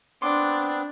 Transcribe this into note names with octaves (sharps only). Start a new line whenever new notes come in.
B3 C4 D4 C6 D6